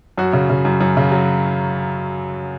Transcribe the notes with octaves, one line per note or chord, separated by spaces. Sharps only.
F#2 F#4
C#3
C#3
F#2
F#2
C#3
F#3